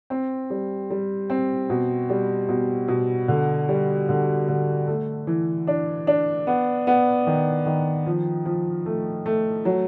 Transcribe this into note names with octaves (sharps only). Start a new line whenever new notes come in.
C4
G3
G3
C4
B2
G3
B2
B2
D3
G3
D3
D3
A3
E3
D4
D4
B3
B3
D#3
D#3
F3
F3
A3
A3
F#3